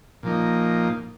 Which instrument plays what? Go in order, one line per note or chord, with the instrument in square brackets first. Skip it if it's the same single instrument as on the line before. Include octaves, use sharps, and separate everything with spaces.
[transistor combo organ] A#2 F3 A#3 D#4